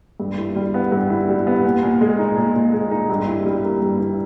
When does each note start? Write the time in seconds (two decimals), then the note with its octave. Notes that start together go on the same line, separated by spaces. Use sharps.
0.20 G2
0.38 E4
0.56 G3
0.74 B3
0.92 G2
1.10 E4
1.29 G3
1.47 B3
1.65 A#2
1.83 A#2
2.01 G#3
2.19 D#4
2.37 A#2
2.55 A#2
2.73 G#3
2.91 D#4
3.10 G2
3.27 E4
3.46 G3
3.64 A#3
3.82 G2
4.00 E4